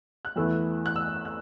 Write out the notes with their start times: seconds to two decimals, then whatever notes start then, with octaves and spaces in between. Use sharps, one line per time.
0.25 F#6
0.36 E2 E3 A3 E4 E6
0.86 F#6
0.96 E6
1.25 F#6